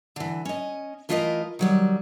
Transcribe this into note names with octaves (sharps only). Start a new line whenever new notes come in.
D3 E3
C#4 D#5
E3 A3 F4 A#4 C#5 D#5
D#3 F#3 G3